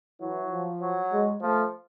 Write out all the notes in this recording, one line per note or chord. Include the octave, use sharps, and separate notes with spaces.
E3 F#3
F3
F#3
G#3
F3 A3